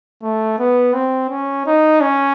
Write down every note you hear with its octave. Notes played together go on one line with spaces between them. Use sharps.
A3
B3
C4
C#4
D#4
C#4